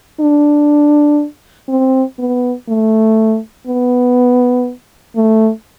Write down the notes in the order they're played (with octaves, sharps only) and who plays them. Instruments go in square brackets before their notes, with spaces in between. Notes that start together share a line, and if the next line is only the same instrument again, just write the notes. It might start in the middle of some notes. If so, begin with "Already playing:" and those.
[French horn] D4
C4
B3
A3
B3
A3